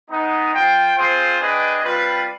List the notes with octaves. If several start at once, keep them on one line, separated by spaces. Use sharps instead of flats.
G#3 B3 D#4
F4 C5 G5
C4 F4 G#4 C5
D4 G#4 B4 D#5 G5
G3 C4 F4 B4